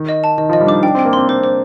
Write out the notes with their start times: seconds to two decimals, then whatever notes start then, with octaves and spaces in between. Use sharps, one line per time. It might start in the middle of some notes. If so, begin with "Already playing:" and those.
Already playing: D#3
0.09 D#5
0.24 A5
0.38 D#3 D#5
0.49 F3 D#5
0.61 G3
0.67 D4 D#4 D6
0.83 D4 G5
0.94 C4 G5
1.05 A#3
1.13 C4 C6
1.28 C4 C5
1.44 C5